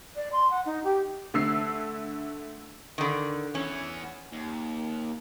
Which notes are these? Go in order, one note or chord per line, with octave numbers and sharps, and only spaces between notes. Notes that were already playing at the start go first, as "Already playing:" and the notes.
D5
C6
F#5
D#4
G4
D3 A3 E6 C7
D3 D#3
E3 B3 C#4
D#2